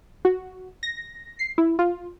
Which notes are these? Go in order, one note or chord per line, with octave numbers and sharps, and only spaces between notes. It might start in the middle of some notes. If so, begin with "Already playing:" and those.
F#4
A#6
C7
E4
F4